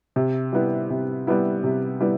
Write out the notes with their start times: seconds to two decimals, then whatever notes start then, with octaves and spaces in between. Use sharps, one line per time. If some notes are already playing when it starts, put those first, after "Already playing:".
0.16 C3
0.53 G3 B3 E4
0.90 C3
1.27 G3 B3 E4
1.64 C3
2.01 G3 B3 E4